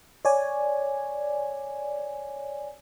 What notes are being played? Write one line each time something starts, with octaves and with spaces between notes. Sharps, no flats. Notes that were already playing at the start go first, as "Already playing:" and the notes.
C#5 D5 G#5